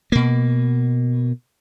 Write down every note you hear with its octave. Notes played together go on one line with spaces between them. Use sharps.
B2 A#3